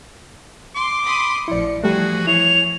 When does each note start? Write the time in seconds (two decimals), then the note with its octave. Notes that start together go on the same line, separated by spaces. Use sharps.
0.75 C6 D6
1.05 B5 C6 D#6
1.48 A1 F3 E4 D5 C#7
1.84 E3 F3 G3 A3 F#4 G#4
2.27 E4 C#5 F7